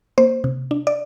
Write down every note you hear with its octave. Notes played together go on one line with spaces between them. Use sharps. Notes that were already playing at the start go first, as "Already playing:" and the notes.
A#3 C5
C3
D4
D5